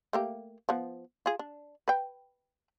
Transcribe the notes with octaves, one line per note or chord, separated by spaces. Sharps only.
A3 A#3 G4
F3 B3
F4 G#4
D4
B4 G5